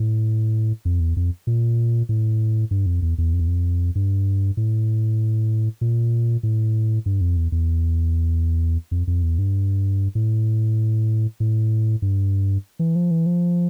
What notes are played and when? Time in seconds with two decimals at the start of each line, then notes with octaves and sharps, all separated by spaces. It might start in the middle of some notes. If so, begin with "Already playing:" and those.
Already playing: A2
0.85 F2
1.00 E2
1.16 F2
1.47 A#2
2.09 A2
2.71 G2
2.86 F2
3.02 E2
3.18 E2
3.33 F2
3.40 E2
3.47 F2
3.95 G2
4.57 A2
5.81 A#2
6.43 A2
7.06 G2
7.21 F2
7.37 E2
7.52 E2
8.91 F2
9.07 F2
9.23 E2
9.38 G2
10.15 A2
11.40 A2
12.02 G2
12.79 E3
12.96 F3
13.11 E3
13.26 F3